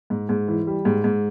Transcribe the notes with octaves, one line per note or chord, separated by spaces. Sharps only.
G#2
G#2
E3
G3
G#2
G#2